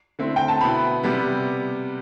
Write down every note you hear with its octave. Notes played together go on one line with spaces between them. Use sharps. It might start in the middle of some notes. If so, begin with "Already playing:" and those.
D3 A3 C4 E4
G5
A5
B2 B3 E4 B5
C3 G3 B3